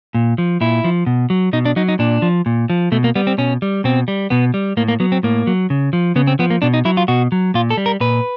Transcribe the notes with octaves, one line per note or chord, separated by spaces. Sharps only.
A#2
F3
A#2 E4
F3
B2
F#3
B2 D#4
D4
F#3 D#4
D#4
A#2 D4
F3
A#2
F3
B2 A3
A#3
G3 B3
C4
B2 C#4
G3
B2 C4
G3
B2 B3
G3
A2 A#3
A#3
F#3 B3
C4
A2 A#3
F#3
C#3
F3
C#3 B3
C4
F3 B3
A#3
B2 D4
D#4
F#3 E4
F4
B2 F#4
F#3
A#2 F4
A4
G3
A#4
A#2 B4